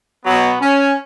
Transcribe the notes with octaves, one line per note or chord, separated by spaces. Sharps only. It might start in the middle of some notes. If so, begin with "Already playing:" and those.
B2 F#3 B3
C#4